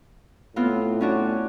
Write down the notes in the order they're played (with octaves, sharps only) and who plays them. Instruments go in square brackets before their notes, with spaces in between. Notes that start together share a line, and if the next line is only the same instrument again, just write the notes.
[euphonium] A2 [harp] B3 C4 F4
[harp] C#4 D4 F#4